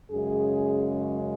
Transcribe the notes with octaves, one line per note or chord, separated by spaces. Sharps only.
F#2 C#3 G#3 G#4